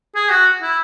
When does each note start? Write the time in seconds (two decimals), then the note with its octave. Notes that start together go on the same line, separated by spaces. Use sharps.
0.15 G#4
0.30 F#4
0.62 E4